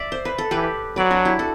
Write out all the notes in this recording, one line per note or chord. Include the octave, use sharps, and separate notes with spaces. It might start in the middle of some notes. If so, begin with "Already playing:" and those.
Already playing: D5 E5
C5
B4
A4
E3 G4 B4
F#3 B4 D5
D4 F#4
E4 G4
F#4 A4